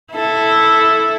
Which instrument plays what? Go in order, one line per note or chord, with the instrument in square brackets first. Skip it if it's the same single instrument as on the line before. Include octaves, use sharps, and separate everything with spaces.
[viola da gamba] E4 A4